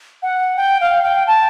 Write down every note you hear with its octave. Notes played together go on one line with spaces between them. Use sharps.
F#5
G5
F5
G5
A5